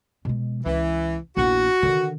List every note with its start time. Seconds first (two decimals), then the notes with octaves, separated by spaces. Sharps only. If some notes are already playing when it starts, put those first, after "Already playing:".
0.25 B2 G#3
0.66 C#2 E3
1.37 A#1 E2 F#4
1.83 D3 D#3